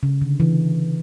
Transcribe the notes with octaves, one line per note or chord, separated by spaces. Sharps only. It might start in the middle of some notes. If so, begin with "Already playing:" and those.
C#3
D3
E3